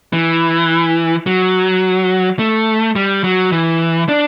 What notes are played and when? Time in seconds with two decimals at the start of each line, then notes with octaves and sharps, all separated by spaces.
0.13 E3
1.27 F#3
2.39 A3
2.96 G3
3.24 F#3
3.52 E3
4.09 D4